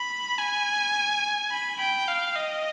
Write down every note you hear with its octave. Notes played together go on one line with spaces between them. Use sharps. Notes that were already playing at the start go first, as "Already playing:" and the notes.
Already playing: B5
G#5
B5
G5
F5
D#5